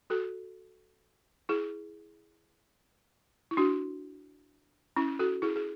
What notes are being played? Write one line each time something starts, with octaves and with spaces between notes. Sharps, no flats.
F#4 A4
E4 G#4
E4
D4 F#4
C#4 E4
F#4 A4
E4 G#4
G#4